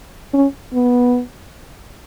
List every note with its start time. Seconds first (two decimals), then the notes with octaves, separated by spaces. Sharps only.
0.33 C#4
0.73 B3